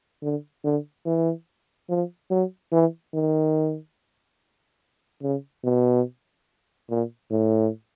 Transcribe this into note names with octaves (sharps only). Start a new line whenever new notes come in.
D3
D3
E3
F3
F#3
E3
D#3
C#3
B2
A#2
A2